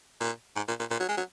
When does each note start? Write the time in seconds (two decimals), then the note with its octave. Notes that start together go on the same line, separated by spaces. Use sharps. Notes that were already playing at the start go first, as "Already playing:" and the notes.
0.20 A#2
0.56 G#2
0.68 A#2
0.79 A#2
0.90 A#2
1.00 F#3
1.09 G#3
1.17 F#3